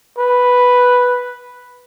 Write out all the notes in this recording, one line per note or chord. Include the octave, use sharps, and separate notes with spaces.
B4